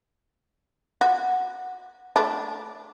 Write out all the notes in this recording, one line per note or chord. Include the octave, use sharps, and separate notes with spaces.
F#4
A3 D4